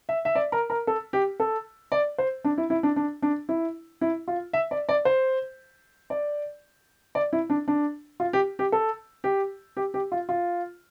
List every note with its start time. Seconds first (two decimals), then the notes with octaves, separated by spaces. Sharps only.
0.09 E5
0.25 E5
0.35 D5
0.52 A#4
0.70 A#4
0.87 A4
1.13 G4
1.40 A4
1.92 D5
2.18 C5
2.45 D4
2.58 E4
2.70 E4
2.83 D4
2.96 D4
3.22 D4
3.49 E4
4.01 E4
4.28 F4
4.53 E5
4.71 D5
4.89 D5
5.05 C5
6.10 D5
7.15 D5
7.33 E4
7.50 D4
7.68 D4
8.20 F4
8.33 G4
8.59 G4
8.72 A4
9.24 G4
9.77 G4
9.94 G4
10.12 F4
10.29 F4